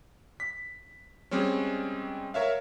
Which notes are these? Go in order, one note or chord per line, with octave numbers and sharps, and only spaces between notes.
B6
G3 G#3 C4 C#4
A#4 C#5 E5 F5